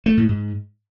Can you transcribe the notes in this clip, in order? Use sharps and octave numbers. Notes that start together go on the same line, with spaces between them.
A3
A2
G#2